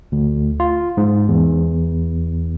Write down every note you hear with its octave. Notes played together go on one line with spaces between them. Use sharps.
D2
F4
G#2
E2